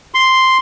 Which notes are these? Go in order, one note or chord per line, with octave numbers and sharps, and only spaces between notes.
C6